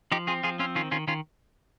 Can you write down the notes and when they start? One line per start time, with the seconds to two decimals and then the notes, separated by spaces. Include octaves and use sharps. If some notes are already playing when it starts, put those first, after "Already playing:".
0.12 F3 D#4 G4
0.27 C4 F4 G#4
0.43 F3 F4 G#4
0.59 C4 C#4 F4
0.75 D#3 C#4 F4
0.91 D#3 C#4 F4
1.08 D#3 C#4 F4